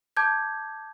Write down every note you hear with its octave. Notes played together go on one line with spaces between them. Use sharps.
A5 D6 G6 G#6